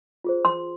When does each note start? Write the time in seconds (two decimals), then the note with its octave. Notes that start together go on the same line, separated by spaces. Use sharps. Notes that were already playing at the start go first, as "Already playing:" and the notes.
0.24 F4 G#4 C5
0.45 C6